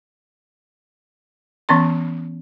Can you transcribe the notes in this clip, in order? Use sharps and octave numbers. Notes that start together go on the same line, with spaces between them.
E3 B3 C#4 C6